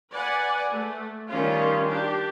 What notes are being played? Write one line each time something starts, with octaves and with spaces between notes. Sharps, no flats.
B4 D5 F#5 G#5
A3
D#3 G3 C#4 F4
D4 G4